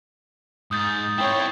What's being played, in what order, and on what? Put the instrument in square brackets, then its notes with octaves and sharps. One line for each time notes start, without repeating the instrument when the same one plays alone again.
[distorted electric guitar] G#2 [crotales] D#6 G6 A6
[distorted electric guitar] C4 E4 [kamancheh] C#5 G5